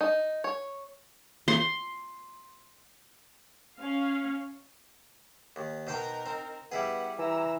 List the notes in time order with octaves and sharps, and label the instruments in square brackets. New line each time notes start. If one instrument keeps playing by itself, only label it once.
[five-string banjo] D#4
C#5
[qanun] C6
[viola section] C#4 F5
[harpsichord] D#2
[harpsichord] B2 C5 G5 [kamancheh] D#4 A#4
[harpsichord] C4
[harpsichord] G3 E4 G#4 [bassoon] B3 [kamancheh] F#5
[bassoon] E3 [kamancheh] A#5 E6